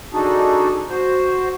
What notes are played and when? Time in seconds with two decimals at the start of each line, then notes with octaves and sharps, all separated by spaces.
0.13 D4 D#4 F#4 G#4 A4
0.89 F#4 C5